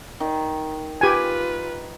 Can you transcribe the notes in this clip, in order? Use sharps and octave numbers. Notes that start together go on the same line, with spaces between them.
D#3
F4 G4 B4 G#5